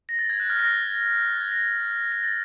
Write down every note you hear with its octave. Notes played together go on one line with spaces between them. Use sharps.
A#6
A6
G#6
F#6
F6
A#6
A6
G#6
A#6
A#6
A6